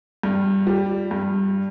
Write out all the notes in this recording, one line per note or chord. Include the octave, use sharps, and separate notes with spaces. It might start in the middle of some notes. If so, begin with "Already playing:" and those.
G2
G3
G2